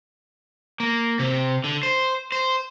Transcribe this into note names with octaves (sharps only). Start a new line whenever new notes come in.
A#3
C3
D3
C5
C5